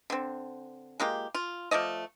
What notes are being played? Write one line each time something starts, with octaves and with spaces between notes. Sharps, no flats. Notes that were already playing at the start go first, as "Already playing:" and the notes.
D3 C4
G#3 A#3 F4 G4
F4
F3 A3 D5 D#5